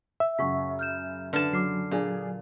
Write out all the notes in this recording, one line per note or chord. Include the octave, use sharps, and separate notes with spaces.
E5
F#2 C#3 F#5 C#6 B6
F6 G6 E7
D3 B4 A5 F6
F#3 D6 F6 C7
A#2 D4 G#4